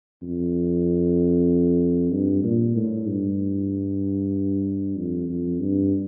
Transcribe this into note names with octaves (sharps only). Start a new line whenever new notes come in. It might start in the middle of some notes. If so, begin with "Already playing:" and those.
F2
G2
A#2
A2
G2
F2
F2
G2